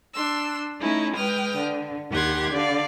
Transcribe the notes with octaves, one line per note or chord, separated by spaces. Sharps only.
D4 C6 E6
A3 C#4 D#4 E4
G#3 B4 G5 D#6 F6
D3
D#2 G4 F#5 C6 G#6
D3 D5 F5